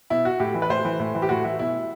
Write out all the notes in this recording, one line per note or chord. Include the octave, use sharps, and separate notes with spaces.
B2 E4
F#4
A2 G4
E3
B4
A2 C5
E3
A2
E3
G4
A2 F#4
E3 E4
B2 E4